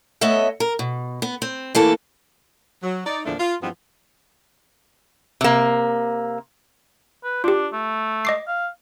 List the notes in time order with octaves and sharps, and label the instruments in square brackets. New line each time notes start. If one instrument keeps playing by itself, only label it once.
[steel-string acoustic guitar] A3 B3 C#5 D#5 E5
A#4
B2
B3
C4
E3 A3 A#3 A4
[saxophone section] F#3
D#4 D5
E2 A#2 D3 F3 A3 D4
F4
G2 E3 F3 G#3 B3 C4
[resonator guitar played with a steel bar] C3 A#3
[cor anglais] B4
[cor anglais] D4 [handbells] F4 G4
[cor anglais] A3
[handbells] D#5 D6 C7
[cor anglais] F5